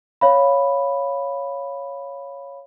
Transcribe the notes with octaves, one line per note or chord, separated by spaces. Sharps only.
C#5 F5 B5